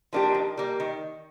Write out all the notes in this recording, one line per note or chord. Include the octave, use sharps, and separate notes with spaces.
F3 A#3 D4 G4
D#3
G3 A#3
D#3